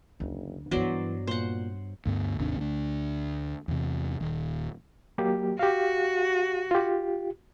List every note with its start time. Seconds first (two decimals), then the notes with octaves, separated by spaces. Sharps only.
0.20 F#1 D2
0.71 G2 E3 F#3 B3 C5 D5
1.27 A#2 C5 F#5
2.06 D2 G2 B3
2.39 G#1 D#2 C3 D4
2.56 D2 D4
3.68 E2 C3
4.20 D#1 D#2
5.18 F#3 A#3 G4
5.59 F#4 G4 F5
6.71 F4 G4